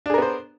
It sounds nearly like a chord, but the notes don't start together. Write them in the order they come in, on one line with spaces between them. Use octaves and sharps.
D4 G#4 A#4 B3 C5